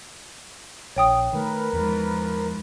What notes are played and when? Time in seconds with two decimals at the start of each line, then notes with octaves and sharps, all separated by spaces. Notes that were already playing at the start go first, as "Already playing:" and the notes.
0.96 A#1 C#5 G5 D#6
1.33 D#3 A3 A#4 B4
1.73 E2 G#2 F3